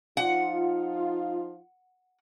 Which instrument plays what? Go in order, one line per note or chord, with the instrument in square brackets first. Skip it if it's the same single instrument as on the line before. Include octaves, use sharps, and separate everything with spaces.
[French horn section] F3 D#4 F4 [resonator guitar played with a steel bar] F#5